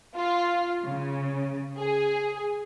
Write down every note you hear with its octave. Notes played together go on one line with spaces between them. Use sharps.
F4
C#3
G#4